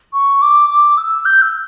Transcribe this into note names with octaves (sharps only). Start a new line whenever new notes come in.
C#6
D6
D6
E6
G6
E6